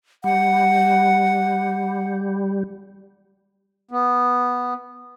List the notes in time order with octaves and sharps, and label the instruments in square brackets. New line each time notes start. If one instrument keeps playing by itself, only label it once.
[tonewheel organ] G3 [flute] F#5
[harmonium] B3